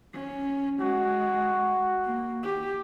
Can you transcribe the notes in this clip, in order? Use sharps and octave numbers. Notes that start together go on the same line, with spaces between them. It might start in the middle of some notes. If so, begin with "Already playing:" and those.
C#4
G#3 F#4
A#3
G4